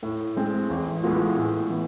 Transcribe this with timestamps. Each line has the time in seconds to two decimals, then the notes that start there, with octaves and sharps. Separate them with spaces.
0.03 A2
0.37 G#3 C4
0.69 A1
1.03 A2 G#3 B3 F4
1.37 A2
1.70 E3 B3